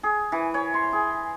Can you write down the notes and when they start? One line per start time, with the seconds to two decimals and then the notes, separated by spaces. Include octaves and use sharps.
0.03 G#4
0.32 E3
0.54 C#5
0.74 C6
0.93 G#4